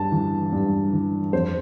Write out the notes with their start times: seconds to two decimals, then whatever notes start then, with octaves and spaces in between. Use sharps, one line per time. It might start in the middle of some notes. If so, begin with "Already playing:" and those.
Already playing: G2 A5
0.12 E3
0.52 G2
0.92 E3
1.33 F2 C5